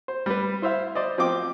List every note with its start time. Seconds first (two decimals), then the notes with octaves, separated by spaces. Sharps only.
0.08 C5
0.26 G3 B4
0.62 E4 C5 E5 F5
0.95 C5 D5 D#5
1.18 F3 C4 F4 D#5 G5 D6